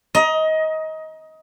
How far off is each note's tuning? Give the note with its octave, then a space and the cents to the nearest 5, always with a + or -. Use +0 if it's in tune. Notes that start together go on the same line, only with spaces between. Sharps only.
D#5 +20 A#5 +25